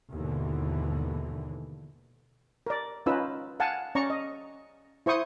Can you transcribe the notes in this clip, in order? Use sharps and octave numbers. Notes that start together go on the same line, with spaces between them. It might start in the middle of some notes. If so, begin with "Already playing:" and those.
D#2 G#2 B2 D3 E3
A#4 D5
C#4 D#4 F4 B4 E6
F5 F#5 G#5 A5
C#4 D5 A#5 C#6
D#5
E4 C5 C#6 D#6